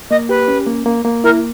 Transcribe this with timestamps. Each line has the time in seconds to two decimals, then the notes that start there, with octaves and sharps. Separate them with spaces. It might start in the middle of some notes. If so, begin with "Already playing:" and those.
0.11 A#3 D#5
0.29 G4 B4
0.48 C#4
0.66 A#3
0.86 A#3
1.05 A#3
1.24 E4 A#4